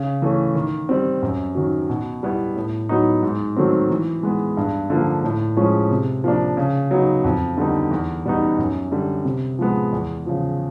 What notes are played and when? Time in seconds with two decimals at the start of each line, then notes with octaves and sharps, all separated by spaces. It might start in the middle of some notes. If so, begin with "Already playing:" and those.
Already playing: C#3
0.22 E3 A3 C#4
0.55 D#3
0.89 G3 C4
1.22 F#2
1.55 D#3 F#3
1.90 B2
2.23 G3 B3 E4
2.56 A2
2.89 F#3 B3 D#4
3.23 G#2
3.56 D#3 F#3 A3 C4
3.90 E3
4.23 G#3 B3
4.57 G2
4.90 D3 F3 A#3
5.24 A2
5.57 F3 G#3 C#4
5.91 C3
6.24 F3 A#3 D4
6.57 C#3
6.91 F#3 B3 D#4
7.24 F2
7.57 D3 G3 B3 D#4
7.91 E2
8.25 B2 G3 B3 D#4
8.58 F#2
8.92 D3 G3
9.25 C3
9.59 F3 G#3 B3
9.93 E2
10.26 C#3 F3